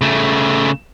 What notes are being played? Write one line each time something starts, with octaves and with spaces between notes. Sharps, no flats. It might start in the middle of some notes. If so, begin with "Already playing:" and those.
C#3 A3